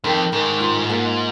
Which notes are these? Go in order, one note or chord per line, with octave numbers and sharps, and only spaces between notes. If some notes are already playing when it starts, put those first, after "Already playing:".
F2 D#3
G#2 D#3
F4
A#3